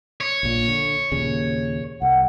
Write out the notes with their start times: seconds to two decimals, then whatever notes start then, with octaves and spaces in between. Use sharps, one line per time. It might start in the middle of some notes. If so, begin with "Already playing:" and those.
0.21 C#5
0.43 A#1 A#2
0.68 D3
1.12 D#2 A#2 C#3
2.02 C2 F#5